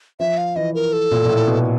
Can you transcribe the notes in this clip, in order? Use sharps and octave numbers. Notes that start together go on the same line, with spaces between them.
F3 E5
F5
E3 D#5
A#4
A4
A#2
A#2
A2
B2